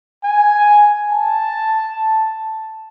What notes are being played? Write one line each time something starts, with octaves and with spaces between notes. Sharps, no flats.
G#5
A5